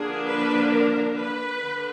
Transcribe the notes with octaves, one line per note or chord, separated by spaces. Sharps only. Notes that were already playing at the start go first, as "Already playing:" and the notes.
Already playing: D3 F3 A#3 D4 G#4
B4
A#4
B4
D3